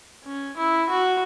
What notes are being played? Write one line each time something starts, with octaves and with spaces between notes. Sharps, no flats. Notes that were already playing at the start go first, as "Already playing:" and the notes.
C#4
E4
F#4